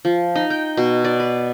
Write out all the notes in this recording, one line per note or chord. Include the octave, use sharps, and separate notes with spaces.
F3
D#4
G5
B2
D5
B4